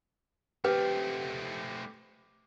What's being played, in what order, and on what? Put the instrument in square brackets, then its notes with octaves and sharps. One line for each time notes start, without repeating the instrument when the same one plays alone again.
[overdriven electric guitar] A3 C4 [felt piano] G4 [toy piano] B4